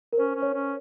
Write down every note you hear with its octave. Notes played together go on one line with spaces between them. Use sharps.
A#4
C#4 C5
C#4
C#5
C#4